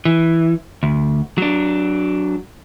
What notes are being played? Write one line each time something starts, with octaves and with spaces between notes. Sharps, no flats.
E3
D2
F#3 D4